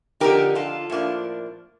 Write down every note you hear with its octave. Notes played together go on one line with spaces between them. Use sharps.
D3 F3 C4 D#4 G4 A#4
F4 A4
A2 F3 A#3 D4